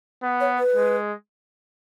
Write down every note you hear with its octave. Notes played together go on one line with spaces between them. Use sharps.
B3
C#5
B4
G#3